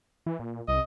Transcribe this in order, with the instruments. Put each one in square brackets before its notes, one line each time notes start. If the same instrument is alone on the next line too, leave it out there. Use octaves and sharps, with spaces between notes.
[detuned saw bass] E3
A#2
[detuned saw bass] C2 [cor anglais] D#5